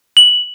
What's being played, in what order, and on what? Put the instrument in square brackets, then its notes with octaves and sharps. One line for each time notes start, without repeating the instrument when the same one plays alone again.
[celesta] F#7